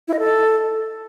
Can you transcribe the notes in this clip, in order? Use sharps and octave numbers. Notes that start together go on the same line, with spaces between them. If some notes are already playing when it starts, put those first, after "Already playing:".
E4
D#5
A4